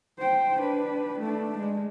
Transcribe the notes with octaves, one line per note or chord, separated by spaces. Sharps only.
C5 G5
D4 B4
A3 D4
G#3